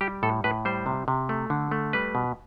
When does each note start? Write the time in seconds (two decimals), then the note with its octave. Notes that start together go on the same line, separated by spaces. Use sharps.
0.01 G3 G4
0.23 A2 A4
0.44 A2 B4
0.65 G3 C5
0.86 C3
1.08 C3
1.29 A3
1.50 D3
1.71 A3
1.93 G3 B4
2.15 B2